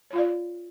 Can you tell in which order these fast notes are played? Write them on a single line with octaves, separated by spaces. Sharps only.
C#5 F4 F5 D5